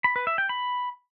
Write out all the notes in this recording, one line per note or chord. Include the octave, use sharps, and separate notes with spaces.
B5
B4
E5
G5
B5